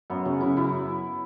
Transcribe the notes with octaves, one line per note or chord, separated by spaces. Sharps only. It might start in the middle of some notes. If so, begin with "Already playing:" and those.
F#2 B3
C#3 C#4
C#3 E4
F#2 E4